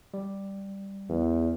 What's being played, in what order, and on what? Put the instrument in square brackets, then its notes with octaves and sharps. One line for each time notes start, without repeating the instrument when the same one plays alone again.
[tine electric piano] G3
[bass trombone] E2